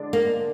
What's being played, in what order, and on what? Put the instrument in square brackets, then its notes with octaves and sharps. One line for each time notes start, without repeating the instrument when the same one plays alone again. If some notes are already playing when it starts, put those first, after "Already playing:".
Already playing: [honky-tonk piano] D3 G#3 D4
[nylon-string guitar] A#3